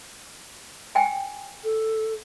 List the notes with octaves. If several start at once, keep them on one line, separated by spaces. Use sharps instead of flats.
G5 G#5
A4